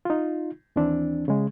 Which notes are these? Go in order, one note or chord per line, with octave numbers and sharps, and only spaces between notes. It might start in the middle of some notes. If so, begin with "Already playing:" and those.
D#4 F4
D#2 E3 C4 D4
C#3 G#3